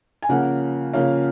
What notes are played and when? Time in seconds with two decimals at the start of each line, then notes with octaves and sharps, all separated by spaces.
0.22 G#5
0.29 C#3 F3 A#3 C#4 F#5
0.93 C#3 F3 A#3 C#4 F5